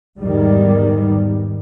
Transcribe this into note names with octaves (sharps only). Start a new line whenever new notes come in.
E2 G#2 D#3 G3